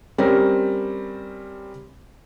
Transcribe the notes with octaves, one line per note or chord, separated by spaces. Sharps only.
G3 C4 C#4 A#4